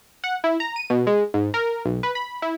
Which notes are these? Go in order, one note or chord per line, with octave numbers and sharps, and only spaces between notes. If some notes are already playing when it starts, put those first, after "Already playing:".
F#5
E4
A#5
D#7
B2
G#3
G#2
A#4
B1
B4
B5
E4